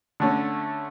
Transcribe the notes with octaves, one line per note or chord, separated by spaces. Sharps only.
D3 A3 C#4